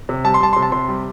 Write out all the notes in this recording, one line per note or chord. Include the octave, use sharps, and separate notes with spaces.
C3
G3 A5
C6
G3 A5
C3 C6
A5
C3 C6
G3